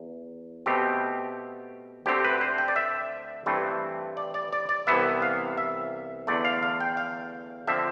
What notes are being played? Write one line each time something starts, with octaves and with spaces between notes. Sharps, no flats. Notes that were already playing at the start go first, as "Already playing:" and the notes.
Already playing: E2
B2 A3 C4 G4
D2 D3 A3 C4 G4
B4
C5
G5
D5
E5
G2 E3 A3 C4
D5
D5
D5
D5
C2 C3 E3 B3 E5
F5
E5
E2 D3 A3 D5
F5
F5
G5
F5
D3 F3 C4 E5